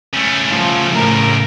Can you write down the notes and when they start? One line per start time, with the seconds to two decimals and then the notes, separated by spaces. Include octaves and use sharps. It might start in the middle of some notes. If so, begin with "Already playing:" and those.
0.13 C#3 A3
0.48 F3
0.92 A2 A#4